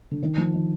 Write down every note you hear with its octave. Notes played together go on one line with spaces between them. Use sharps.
D3
D#3
F3
D#3